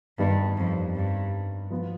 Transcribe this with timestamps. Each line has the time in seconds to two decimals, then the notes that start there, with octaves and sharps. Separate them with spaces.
0.18 G2 D#3 G3 B3
0.57 F2
0.95 G2
1.70 F3 B3 F4